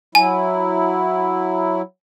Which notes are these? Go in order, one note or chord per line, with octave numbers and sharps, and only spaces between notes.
F#3 E4 G#5